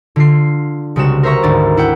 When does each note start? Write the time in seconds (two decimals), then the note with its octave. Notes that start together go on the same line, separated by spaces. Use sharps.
0.16 D3 F4 C7
0.96 C2 C#3 G3 G#3 F#4 E7
1.23 A#4 C5 E5 A#5 C#6
1.43 G#1 D2 D5
1.77 E4 F#5 G5